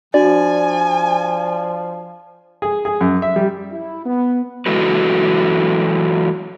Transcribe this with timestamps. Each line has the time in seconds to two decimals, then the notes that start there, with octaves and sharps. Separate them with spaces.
0.14 F3 D4 F#4 D5 G#5
2.62 G#4
2.85 G#4
3.01 F#2
3.22 E5
3.36 G3
3.71 E4
4.05 B3
4.66 E3 F#3 G#3 F#4 A4 B4